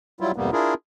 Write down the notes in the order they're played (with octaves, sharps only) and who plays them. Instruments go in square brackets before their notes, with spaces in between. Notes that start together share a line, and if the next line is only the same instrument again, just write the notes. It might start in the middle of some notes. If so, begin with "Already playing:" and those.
[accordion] F#3 G3 E4 F4
F2 G#2 C3 G3 A#3 B3
D4 E4 F4 G#4 A#4